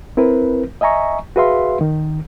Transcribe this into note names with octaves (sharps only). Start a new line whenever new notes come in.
C4 E4 A#4 B4
D#5 E5 G#5 A#5 C#6
F#4 G#4 B4 E5 F5 C6
D#3